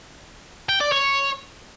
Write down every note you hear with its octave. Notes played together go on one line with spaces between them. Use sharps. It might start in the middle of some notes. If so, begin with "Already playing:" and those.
G5
D5
C#5